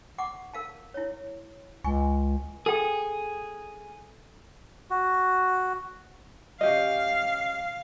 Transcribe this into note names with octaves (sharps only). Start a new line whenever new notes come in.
F#5 C#6 D6
A#4 F5 A5
E4 C#5
C#2 G#5 C#6
G#4 A4 G5
F#4
C#4 G4 D#5 F5